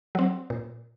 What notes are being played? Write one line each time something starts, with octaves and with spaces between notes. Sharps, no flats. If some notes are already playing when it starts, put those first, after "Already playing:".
F#3 C4
A#2